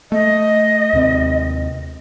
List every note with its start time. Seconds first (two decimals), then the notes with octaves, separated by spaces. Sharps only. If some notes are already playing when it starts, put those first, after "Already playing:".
0.12 A3 D#5
0.93 D#2 C3 C4